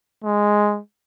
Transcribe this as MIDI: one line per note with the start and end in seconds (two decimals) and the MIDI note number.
0.24 0.80 56